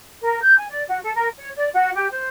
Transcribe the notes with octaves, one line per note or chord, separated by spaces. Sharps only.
A#4
G6
G#5
D5
F#4
A4
A#4
C#5
D5
F#4
G4
C5